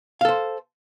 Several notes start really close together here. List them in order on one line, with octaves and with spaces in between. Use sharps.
F5 A4 C5